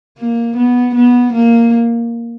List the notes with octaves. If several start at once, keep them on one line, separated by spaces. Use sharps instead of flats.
A#3
B3
B3
A#3